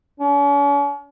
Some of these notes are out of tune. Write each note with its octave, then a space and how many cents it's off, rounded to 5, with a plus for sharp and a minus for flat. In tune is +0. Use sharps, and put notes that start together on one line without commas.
C#4 +45